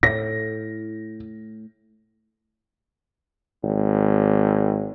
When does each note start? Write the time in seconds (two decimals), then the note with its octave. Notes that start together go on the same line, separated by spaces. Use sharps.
0.03 A2 A#6
3.64 G#1